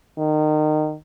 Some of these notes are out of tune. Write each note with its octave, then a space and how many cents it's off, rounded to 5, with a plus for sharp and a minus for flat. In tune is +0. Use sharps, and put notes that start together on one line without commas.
D#3 -25